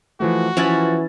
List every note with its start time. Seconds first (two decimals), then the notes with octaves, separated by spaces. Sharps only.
0.20 E3 F3 A3 F#4
0.57 E3 F3 C#4 E4 B5 A6